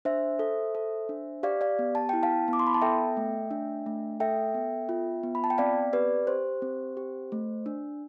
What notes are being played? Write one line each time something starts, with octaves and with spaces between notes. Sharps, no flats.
D4 C5 E5
A4
A4
D4
G4 D5 F5
D5 F5
B3
A5
E4 G5
F5 A5
B3
D6
C6
B5
A5
A4 E5 G5
A3
D4
A3
A4 E5 G5
B3
F4
B3
B5
A5
G5
C4 D5 F5
G4 B4 D5
G4 C5
C4
G4
A3
D4